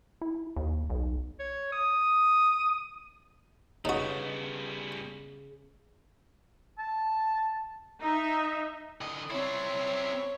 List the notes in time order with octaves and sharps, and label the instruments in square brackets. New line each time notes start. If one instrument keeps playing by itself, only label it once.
[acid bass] E4
D#2
B1
[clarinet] C#5
D#6
[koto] C#3 [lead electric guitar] G3 B3 [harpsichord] D#4 F#4
[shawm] A5
[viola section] D#4 E5
[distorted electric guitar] D3 D#5
[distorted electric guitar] C4 E4 [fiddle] C#5